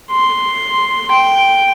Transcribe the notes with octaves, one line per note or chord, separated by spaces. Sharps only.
C6
G5